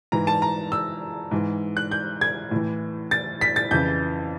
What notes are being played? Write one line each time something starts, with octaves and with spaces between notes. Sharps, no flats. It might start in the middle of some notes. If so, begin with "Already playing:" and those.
G#2 E3 A#5
A5
A#5
E6
G#2 E3
F#6
G6
G#6
A2 E3
A6
B6
A6
F2 C#3 E3 G6